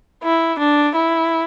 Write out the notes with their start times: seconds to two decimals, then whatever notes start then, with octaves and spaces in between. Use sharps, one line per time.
0.23 E4
0.59 D4
0.95 E4